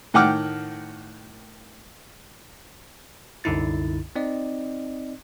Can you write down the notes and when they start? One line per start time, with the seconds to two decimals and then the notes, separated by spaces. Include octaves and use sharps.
0.14 A2 D#3 F#5 G5 D6 F6
3.44 C2 F#2 D3 D#4 E4 A6
4.16 C4 D#4 D5 D#5